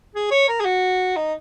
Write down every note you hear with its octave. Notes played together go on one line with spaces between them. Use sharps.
G#4
C#5
A#4
G#4
F#4
D#4